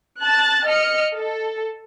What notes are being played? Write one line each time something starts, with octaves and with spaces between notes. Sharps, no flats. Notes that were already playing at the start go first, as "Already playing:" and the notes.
A5 F#6 A6
D#5 F6 C#7
A4